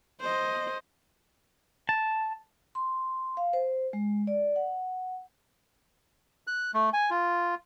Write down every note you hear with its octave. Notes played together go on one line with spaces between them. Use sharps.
C5 D#5
A5
C6
F5
C5
G#3
D5
F#5
F#6
A3
G#5
F4